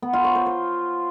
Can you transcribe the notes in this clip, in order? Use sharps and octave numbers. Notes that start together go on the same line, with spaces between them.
B3
F4
C#5
C5
C5